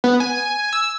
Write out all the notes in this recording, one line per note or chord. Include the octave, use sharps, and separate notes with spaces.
B3
G#5
E6